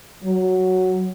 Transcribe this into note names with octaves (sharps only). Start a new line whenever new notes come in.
F#3